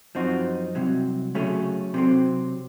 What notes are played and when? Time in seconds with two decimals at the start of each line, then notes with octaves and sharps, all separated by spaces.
0.15 F#2 F3 C4 D#4 F#4
0.75 C2 C3 F#3
1.35 C#3 F#3 A3 C#4
1.94 C3 F#3 C4